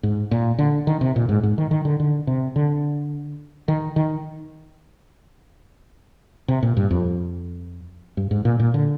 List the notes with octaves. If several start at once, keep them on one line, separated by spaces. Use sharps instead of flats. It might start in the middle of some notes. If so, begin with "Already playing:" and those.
G#2
A#2
D3
D#3
C3
A#2
G#2
G#2
D#3
D#3
D3
D3
C3
D3
D#3
D#3
C3
A#2
G2
F2
G2
G#2
A#2
A#2
D3